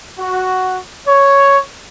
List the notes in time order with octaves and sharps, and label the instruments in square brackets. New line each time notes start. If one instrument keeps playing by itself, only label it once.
[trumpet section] F#4
C#5